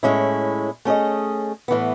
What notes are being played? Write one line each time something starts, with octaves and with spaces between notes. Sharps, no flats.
A2 G#3 C#4 E4
A3 C#4 G#4 D#5
A2 E3 B3